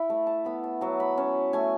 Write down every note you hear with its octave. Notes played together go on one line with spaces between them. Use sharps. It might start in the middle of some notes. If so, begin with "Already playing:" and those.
Already playing: E4 B5
A3 A5
A5
B3 B5
A5
F#3 A5
B5
C#4 A5
A3 G#5